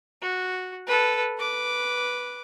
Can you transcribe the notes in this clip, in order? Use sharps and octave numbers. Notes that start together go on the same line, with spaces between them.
F#4
A4 B4
B4 D6